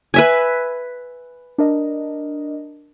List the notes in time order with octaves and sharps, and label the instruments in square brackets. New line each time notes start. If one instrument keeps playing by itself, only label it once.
[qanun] B4 E5 G#5
[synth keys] D4 A#4 D#5